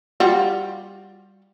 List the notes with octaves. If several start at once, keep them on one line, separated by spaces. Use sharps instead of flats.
G3 F4 F#4